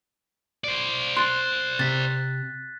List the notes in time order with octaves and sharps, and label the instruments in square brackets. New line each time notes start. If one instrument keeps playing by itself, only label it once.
[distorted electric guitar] C5 D5
[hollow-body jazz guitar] C6 [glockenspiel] F#6 A6
[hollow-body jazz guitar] C3 [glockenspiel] A6 B6